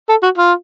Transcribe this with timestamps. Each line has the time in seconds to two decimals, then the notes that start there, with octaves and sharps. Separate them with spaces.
0.09 A4
0.23 F#4
0.38 F4